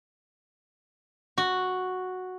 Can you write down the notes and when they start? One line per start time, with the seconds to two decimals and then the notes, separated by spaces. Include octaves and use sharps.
1.38 F#4